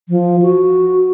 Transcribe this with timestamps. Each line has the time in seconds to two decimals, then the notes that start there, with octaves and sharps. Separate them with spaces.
0.09 F3
0.42 F#4